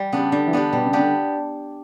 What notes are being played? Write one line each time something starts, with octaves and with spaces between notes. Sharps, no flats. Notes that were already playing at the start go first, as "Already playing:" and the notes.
Already playing: G3
C#3 B3 D4 G4
D3 G3
E3
D3 B3 D4 G4
B2 G3
C#3
B3 D4 G4
D3